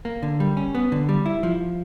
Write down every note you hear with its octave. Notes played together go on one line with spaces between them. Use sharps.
A#3
D3
G3
C#4
B3
D3
G3
E4
F3